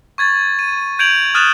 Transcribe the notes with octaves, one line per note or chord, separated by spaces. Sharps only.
C#6 G#6 A6
D#7
G6 G#6 D7 D#7 F7 F#7
D#6 F6 F#6 A6 D#7 E7